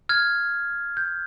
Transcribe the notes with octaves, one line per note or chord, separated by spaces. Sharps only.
F6 G#6
G6